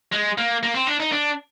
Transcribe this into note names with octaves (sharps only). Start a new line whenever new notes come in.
G#3
A#3
A#3
C4
D4
D#4
D4